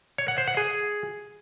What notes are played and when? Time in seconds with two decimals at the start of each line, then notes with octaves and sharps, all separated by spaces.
0.18 C#5
0.28 F#5
0.38 C5
0.47 F#5
0.57 G#4